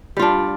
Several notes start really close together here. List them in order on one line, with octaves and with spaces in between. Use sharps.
G3 F4 D4